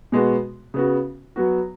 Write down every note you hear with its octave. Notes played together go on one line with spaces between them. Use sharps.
B2 G#3 B3 F#4
C#3 B3 F#4
F#3 B3 F#4